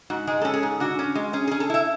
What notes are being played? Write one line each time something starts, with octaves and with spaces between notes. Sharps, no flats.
G#2 F#4
G#3 G#4
C#4 A4
G#4
G#2
D3 F#4
C#4
G#3
C#4 G#4
C#4 G#4
A4
E4 E5